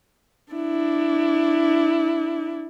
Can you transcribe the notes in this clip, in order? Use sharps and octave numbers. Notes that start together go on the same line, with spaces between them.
D4 E4